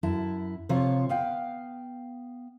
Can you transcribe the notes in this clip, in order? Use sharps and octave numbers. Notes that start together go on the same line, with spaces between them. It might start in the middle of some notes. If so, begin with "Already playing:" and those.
F#2 E4 A5
C3 F3 F4 C#5
B3 F5 G5